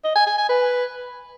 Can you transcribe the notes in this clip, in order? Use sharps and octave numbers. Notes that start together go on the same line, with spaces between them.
D#5
G#5
G#5
G#5
B4